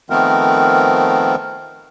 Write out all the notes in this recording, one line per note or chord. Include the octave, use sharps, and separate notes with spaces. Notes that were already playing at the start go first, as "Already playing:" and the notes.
D#3 F3 A3 B3 C4 A#4